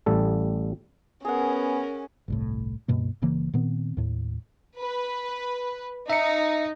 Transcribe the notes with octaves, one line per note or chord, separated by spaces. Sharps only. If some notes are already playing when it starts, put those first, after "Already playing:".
A1 G3 A4
B3 C#4 G#4 A#4 F#5
G1 C2 A2
C#2 G2 B2 A#3
G1 C#3 E3 A#3
A#2 D#3 B3 C4
D#2 A2
B4
D#4 E5 C#7